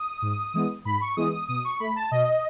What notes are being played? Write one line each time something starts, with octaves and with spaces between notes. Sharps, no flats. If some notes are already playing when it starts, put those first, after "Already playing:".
Already playing: D#6
G#2
E3 G#3 B3
G#2 B5
C#6
E3 G#3 B3 D#6
D#6
B2 D#6
C#6
A3 B5
A5
B2 D#5